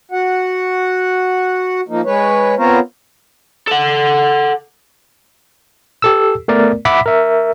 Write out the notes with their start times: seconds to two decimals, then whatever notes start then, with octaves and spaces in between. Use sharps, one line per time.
0.11 F#4 F#5
1.88 F3 A#3 D#4
2.05 G#3 B4 C#5
2.58 B3 C4 F4 A#4 C5 C#5
3.68 A4 F#5
6.02 G4 A4 E6
6.48 A3 B3 A#4 D5
6.85 E5 F#5 B5 D6 B6
7.06 A#4 E5